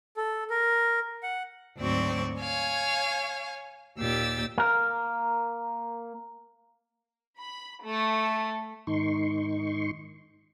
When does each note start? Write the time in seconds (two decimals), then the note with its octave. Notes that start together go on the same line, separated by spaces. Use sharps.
0.17 A4
0.50 A#4
1.23 F#5
1.78 D2 G#2 F#3 C4 D5 C#6
2.40 C#5 F5 G#5
3.99 D#2 A#2 G4 E6 A6
4.58 A#3 A#4
7.39 B5
7.82 A3
8.87 G#2 D#3 D#4 C6 C#6